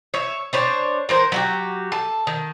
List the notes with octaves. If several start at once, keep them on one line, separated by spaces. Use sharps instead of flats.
C#5 E5
D4 C5 C#5
E3 A#4 C5
F#3 F#4 G4
A4
D#3